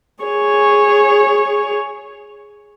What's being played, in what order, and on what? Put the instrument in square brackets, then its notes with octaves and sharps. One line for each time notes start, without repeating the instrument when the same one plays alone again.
[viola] G#4 C#5